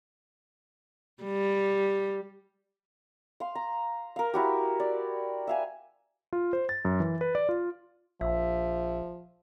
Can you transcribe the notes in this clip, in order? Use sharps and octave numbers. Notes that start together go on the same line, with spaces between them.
G3
F5 C6
A#5
A#4 F5
E4 F#4 G4
D5
E5 F5 G#5
F4
C5
A6
F#2
E3
B4
D5
F4
A#1 F3 E5